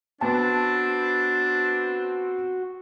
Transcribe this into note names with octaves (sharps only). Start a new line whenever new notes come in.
B3 C4 D4 F#4 A5